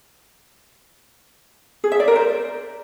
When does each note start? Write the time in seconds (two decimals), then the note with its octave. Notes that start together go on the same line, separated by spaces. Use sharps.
1.84 G#4
1.92 E5
2.00 D5
2.08 A#4
2.16 C5